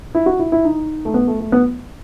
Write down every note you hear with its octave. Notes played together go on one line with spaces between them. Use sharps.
E4
F#4
E4
E4
D#4
A3
B3
A3
A3
B3